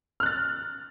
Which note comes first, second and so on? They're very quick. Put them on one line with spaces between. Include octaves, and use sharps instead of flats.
F6 F#6 A6